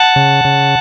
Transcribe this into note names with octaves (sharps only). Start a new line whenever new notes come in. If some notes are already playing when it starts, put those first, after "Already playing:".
Already playing: F#5 A5
C#3
C#3